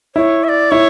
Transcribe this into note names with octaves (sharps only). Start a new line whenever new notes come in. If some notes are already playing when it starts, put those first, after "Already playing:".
E4 C#5
E5
D5
E4 C#5